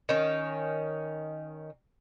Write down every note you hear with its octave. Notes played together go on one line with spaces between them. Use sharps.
D#3 C#4